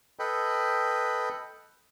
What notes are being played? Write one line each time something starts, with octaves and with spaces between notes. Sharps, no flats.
A4 B4 D#5 G5 B5